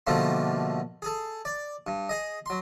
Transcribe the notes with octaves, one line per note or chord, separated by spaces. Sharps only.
B2 D3 F3 G3 A3 A#3
G#4 A4
D5
G2
G#4 D#5
F#3 C6